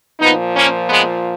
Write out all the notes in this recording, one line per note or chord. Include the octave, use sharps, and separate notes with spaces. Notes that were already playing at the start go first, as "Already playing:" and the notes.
A#2 F3 B3 D#4
A#3 C#4
G#3 B3